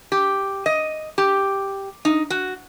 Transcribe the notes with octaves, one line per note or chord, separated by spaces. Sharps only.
G4
D#5
G4
D#4
F#4